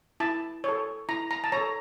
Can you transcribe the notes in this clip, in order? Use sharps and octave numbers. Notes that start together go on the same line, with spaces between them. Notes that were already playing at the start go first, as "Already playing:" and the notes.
E4 A5
A4 C#5
E4 A#5
A#5
A5
A4 C#5 A#5